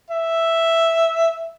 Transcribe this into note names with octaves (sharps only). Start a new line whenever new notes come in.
E5